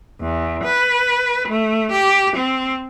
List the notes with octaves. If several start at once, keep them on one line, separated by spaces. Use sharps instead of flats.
E2
B4
A3
G4
C4